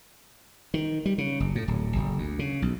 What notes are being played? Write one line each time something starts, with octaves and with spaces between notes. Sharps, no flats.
D#3
G3
C#3
F#1
A2
D1
F#1
D2
C#3
B1